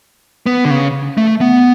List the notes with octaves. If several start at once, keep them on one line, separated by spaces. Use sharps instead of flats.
B3
D3
C#3
A3
B3